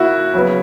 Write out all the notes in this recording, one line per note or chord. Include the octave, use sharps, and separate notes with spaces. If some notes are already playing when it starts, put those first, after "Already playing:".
Already playing: C#3 A#3 E4 F#4
C#3 F#3 B3